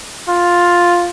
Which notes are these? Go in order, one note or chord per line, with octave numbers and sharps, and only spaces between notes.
F4